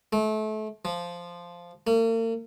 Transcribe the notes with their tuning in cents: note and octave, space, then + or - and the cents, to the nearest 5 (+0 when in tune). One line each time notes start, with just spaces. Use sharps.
A3 -30
F3 -5
A#3 -45